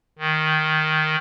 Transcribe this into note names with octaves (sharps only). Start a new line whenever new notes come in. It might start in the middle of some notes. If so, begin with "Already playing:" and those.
D#3